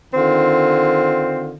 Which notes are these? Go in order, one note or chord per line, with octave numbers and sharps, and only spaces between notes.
D3 D#3 C4 F4